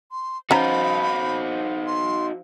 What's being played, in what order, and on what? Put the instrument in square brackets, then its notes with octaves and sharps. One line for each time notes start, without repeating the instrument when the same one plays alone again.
[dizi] C6
[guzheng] F3 [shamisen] C#4 A#5 [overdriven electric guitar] D#4 F#4 [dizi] B5
[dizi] C6